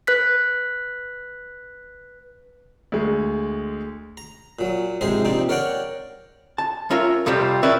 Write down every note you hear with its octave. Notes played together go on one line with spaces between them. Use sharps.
B4 F#6 B6
D2 G#3
A#5
A#2 F#3
A#1 G#2 C3 G#3 G#4 D#5
A#1 C3 C4 D#4 D5
A#4 C#5 D5 F#5 G5 A#5
A5
C#4 F4 A#4 E5
F2 C3 F3 G3 C4
C#4 E4 A#4 B4 D5